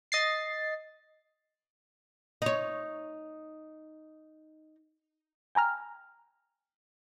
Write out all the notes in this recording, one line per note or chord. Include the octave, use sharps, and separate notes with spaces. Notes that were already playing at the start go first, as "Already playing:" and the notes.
D#5 A6 C7
D#4 C#5
G5 G#5 A#5 F6